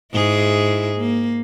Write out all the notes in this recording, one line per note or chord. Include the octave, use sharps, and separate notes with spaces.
G#2 E4 G#4
A#3